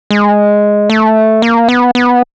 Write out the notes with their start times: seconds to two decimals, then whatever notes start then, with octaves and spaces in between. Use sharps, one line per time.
0.11 G#3
0.90 A3
1.42 A#3
1.69 B3
1.95 B3